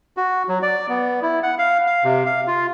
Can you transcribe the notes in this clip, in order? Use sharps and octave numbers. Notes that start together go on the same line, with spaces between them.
F#4
F#3
D5
B3
E4
F#5
F5
F5
C3
F5
F4